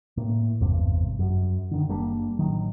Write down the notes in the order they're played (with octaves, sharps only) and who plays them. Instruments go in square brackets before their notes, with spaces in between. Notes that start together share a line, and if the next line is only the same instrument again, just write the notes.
[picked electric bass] A2 A#3
G#1 E2 G2 C3
F#2
D3 D#3
F#1 G3 A#3 D4
A1 D#3 F#3